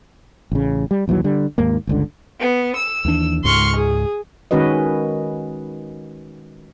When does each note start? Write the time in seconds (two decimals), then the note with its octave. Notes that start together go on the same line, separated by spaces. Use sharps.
0.52 A1 C#3
0.91 G3
1.08 A#1 D#2 E3 F#3
1.24 D3 G3
1.58 D#2 G#2 A#3
1.87 G1 C#2 D3
2.39 B3
2.75 E6
3.05 D#2 E3 D4
3.44 C#2 G#2 C6 C#6 F6
3.75 G#4
4.51 D#3 G#3 C#4 F#4 B4 D#5